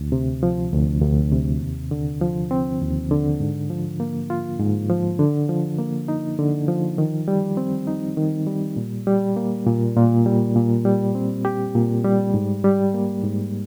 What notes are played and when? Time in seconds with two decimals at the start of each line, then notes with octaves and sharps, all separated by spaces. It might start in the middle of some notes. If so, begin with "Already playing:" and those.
Already playing: D2
0.12 C3
0.43 F3
0.72 D2
1.02 D2
1.32 C3
1.62 D#2
1.91 D3
2.21 F3
2.51 C4
2.81 D#2
3.11 D3
3.40 G#2
3.70 F3
4.00 A#3
4.30 F4
4.59 G#2
4.89 F3
5.19 D3
5.49 F3
5.79 A#3
6.08 D#4
6.39 D3
6.68 F3
6.98 D#3
7.28 G3
7.57 C4
7.87 D#4
8.17 D#3
8.47 G3
8.77 A#2
9.07 G3
9.36 A#3
9.66 A#2
9.96 A#2
10.26 G3
10.55 A#2
10.85 G3
11.15 C4
11.45 G4
11.75 A#2
12.05 G3
12.34 G#2
12.64 G3
12.94 A#3
13.24 G#2